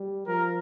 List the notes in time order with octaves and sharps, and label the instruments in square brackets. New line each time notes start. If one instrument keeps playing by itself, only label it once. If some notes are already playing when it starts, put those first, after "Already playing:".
Already playing: [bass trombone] G3
[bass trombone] F3 [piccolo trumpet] A#4